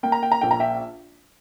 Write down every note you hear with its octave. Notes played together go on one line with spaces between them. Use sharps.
A#3 G5
A#5
G5
A#5
A#1 G5
A#5
E5 G5